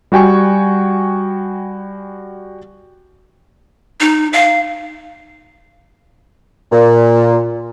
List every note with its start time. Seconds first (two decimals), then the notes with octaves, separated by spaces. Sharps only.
0.12 G3 F#4 G5 G#5 C#6
4.00 D#4
4.33 F5
6.72 A#2